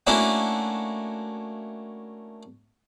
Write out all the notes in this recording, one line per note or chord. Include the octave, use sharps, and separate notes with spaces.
A3 A#3 C#4 D4 E4 F#4